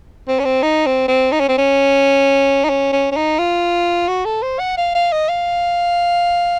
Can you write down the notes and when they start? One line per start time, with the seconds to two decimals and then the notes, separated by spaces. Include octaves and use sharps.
0.28 C4
0.39 C#4
0.45 C4
0.63 D#4
0.86 C4
1.08 C4
1.32 D#4
1.40 C#4
1.49 C4
1.58 C#4
2.64 D#4
2.69 C#4
2.92 C#4
3.12 C#4
3.16 D#4
3.39 F4
4.08 F#4
4.25 A4
4.42 C5
4.59 F#5
4.77 F5
4.95 F5
5.12 D#5
5.29 F5